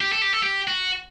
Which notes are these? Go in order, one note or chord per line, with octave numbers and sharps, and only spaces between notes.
G4
A4
G4
A4
G4
F#4